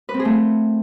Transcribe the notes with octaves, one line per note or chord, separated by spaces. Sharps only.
B4
C4
G#4
A3